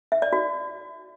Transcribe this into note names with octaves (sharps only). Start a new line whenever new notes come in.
E5
D5
F#4